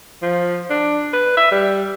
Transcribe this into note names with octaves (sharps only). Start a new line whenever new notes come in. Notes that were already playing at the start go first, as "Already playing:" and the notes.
F3
D4
B4
E5
G3